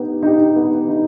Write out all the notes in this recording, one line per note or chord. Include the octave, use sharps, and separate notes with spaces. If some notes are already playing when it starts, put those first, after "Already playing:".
Already playing: B3 D#4 G4
D#4 G4
B3
D#4